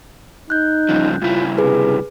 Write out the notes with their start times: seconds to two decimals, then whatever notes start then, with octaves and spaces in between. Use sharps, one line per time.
0.50 D#4 F#6 G6
0.89 G2 C#3 F3
1.22 G2 C#3 E4 F4
1.58 C3 G#4 B4